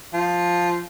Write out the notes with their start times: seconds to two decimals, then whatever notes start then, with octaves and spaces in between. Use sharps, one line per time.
0.14 F3